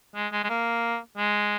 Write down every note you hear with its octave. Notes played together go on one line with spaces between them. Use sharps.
G#3
G#3
G#3
A#3
G#3